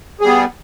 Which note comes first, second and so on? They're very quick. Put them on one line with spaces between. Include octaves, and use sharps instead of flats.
G#4 G3 B3